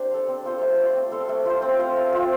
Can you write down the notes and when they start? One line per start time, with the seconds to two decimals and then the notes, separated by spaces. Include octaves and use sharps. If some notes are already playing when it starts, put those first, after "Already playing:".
Already playing: C4 D4 G4 C5
0.11 A4 F5
0.28 C4
0.45 F4 A4 C5
0.61 A3
0.79 F4 D5
0.95 C4
1.12 A4 C5 F5
1.29 A3
1.46 F4 C5
1.62 C4
1.79 F4 C5 F5
1.96 A3
2.13 C4 F4